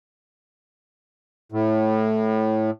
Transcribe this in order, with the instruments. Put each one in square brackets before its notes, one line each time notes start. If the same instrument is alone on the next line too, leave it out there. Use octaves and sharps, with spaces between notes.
[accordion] A2